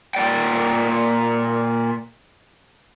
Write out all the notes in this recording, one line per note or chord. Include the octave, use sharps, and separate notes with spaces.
A#2 D5 G5